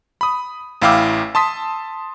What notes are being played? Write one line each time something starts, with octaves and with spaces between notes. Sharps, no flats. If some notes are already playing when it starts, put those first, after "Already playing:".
B5 D#6
A1 E4 F5 G5 D6 E6
A5 C6 D#6 B6